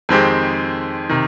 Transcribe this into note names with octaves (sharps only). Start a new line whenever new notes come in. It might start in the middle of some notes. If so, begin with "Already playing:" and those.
F2 D#3 G#3 C4 G4
C3 D#3